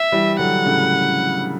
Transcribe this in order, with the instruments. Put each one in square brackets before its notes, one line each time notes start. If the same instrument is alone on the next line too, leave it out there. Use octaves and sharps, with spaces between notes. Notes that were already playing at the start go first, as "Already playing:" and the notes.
Already playing: [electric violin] E5
[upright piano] E3 G3
[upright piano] D3 F#3 [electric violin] F#5
[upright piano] A2 C#3